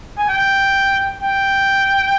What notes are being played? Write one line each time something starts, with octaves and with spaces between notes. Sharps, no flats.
G#5
G5
G5